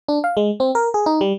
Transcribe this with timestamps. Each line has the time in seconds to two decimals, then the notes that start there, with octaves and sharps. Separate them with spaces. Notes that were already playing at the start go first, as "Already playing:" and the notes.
0.08 D4
0.24 F5
0.37 G#3
0.60 C4
0.75 A#4
0.94 G#4
1.06 D#4
1.21 G3